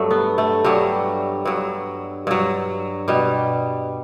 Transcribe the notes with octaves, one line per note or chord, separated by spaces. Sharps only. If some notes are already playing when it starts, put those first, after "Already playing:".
Already playing: G2 F#3 A3
B3
A3
G2 F#3 G3
G2 F#3
G2 F#3
B2 G3